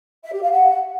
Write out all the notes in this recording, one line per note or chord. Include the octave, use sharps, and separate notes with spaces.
E5
G4
F5
F#5